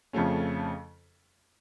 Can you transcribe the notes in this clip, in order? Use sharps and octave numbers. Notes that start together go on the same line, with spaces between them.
F2 C#3 F3 A3 C#4